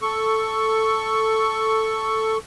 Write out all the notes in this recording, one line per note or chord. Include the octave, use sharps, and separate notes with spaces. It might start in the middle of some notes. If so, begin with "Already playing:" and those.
A4 C#6